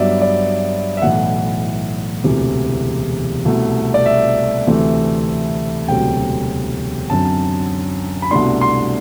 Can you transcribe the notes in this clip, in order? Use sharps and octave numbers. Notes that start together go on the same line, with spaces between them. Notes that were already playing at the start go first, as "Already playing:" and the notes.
Already playing: G2 F#3 B3 D5 E5
D5
E5
B1 A2 E3 F#5
E1 D2 C3 E3
C2 B2 A3
D5
E5
D2 C3 E3 A3 C4
E1 D2 C3 F#3 G5
F#2 D3 F#3 C4 A5
B5
C2 B2 A3 D4 C6
C6